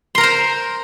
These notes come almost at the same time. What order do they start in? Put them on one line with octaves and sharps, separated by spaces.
C6 A#4 A#5 C5